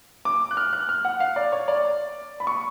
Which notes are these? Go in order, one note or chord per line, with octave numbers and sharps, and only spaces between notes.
D6
F#6
F6
F#6
F6
F#5
F5
D5
C#5
D5
B5
C#6